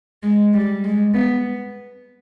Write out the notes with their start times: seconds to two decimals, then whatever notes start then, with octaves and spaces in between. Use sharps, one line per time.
0.23 G#3
0.53 G3
0.84 G#3
1.14 B3